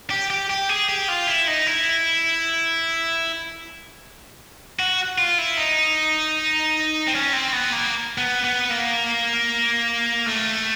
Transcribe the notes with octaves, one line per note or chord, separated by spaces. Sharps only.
G4
G4
G4
G#4
G4
F4
E4
D#4
E4
F#4
F4
E4
D#4
C4
C#4
C4
B3
A#3
B3
B3
A#3
A3